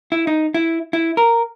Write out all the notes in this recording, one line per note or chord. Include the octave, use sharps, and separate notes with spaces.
E4
D#4
E4
E4
A#4